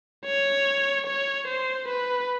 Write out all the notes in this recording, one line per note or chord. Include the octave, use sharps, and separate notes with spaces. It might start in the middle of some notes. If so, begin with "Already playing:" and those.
C#5
C#5
C5
B4